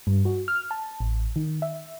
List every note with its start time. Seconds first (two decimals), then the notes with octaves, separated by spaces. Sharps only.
0.07 G2
0.25 F#4
0.48 F6
0.71 A5
1.00 A1
1.36 D#3
1.62 E5